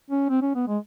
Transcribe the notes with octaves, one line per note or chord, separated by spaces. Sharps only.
C#4
C4
C#4
B3
G#3